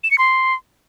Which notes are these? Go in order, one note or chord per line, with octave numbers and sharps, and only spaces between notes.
E7
C#7
C6